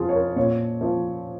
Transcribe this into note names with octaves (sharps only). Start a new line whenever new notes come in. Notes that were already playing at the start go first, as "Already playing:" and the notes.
Already playing: F2 F3 F4 G#4
C#5
A#4
A#2 C#5
F3